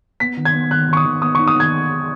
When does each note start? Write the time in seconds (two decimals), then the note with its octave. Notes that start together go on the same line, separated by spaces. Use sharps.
0.20 B3 B6
0.37 D#3
0.45 G#6
0.54 B3
0.71 D#3 F#6
0.89 D#3 C#6
0.97 D#6
1.05 D#3
1.22 B3 D#6
1.35 D#4 C#6
1.47 D#6
1.56 D#3 G#6